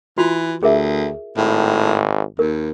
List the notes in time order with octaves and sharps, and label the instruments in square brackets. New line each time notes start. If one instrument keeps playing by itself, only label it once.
[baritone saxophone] E3 [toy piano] F4 F#4
[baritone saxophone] D2 [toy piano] G#4 A#4 E5
[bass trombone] G#1 [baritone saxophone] A2
[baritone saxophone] D#2 [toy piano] A#4